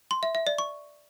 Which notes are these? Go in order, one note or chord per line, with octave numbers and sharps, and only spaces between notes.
C6
E5
E5
D5
C#6